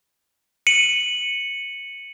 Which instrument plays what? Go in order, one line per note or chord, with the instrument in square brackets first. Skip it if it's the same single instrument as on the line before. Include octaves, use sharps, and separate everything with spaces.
[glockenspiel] C#7 D#7 F#7